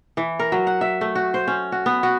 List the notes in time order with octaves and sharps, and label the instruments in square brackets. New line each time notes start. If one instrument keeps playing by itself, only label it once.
[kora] E3
A#4
F#3
F#5
E5
A3
F#4
C5
C#4
F#4
B3
F#4